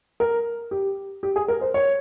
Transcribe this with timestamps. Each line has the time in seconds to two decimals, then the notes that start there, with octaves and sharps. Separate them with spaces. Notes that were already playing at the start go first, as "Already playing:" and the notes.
0.20 A#4
0.71 G4
1.23 G4
1.36 G#4
1.48 A#4
1.61 C5
1.74 C#5